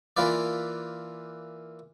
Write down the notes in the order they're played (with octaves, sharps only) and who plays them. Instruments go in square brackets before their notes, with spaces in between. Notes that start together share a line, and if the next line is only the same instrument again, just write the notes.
[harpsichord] E3 A#3 F4 B4 D5